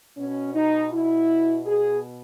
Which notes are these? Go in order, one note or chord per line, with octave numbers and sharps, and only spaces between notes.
B2 C#4
D#4
E4
G#4